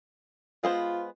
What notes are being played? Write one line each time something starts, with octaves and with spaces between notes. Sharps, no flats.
G#3 B3 F4 C5